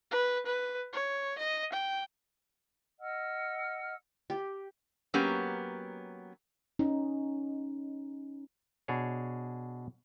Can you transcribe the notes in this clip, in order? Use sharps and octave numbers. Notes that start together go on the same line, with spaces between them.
B4
B4
C#5
D#5
G5
D#5 F#5 E6 F6
G4
F#3 A#3 B3 C#4 G4
C#4 D#4
B2 D4 G#4 C#5